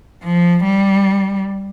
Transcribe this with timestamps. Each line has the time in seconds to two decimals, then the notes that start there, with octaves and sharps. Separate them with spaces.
0.23 F3
0.64 G3